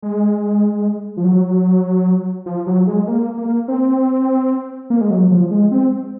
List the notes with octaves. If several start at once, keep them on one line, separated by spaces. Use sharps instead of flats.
G#3
F3
F#3
F3
F#3
G#3
A#3
A#3
C4
A#3
G#3
F#3
F3
G#3
C4